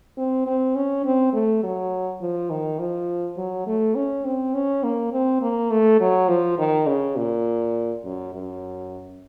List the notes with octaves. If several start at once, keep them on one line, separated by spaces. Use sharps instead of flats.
C4
C4
C#4
C4
A3
F#3
F3
D#3
F3
F#3
A3
C#4
C4
C#4
A#3
C4
A#3
A3
F#3
F3
D#3
C#3
A#2
F#2
F#2